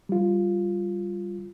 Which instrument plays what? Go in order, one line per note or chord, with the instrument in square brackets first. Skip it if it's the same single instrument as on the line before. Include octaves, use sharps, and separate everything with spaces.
[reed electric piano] G3 F4